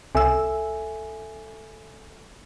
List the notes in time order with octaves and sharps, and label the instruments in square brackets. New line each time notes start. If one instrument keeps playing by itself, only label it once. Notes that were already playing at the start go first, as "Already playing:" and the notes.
[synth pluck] C2 E6 [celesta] A4 E5 G#5